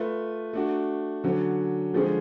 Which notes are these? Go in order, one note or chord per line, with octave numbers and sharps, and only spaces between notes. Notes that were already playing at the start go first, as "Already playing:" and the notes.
Already playing: A3 F4 B4
A3 D4 F#4
D3 F#3 C#4
D3 F3 G#3 C#4 G#4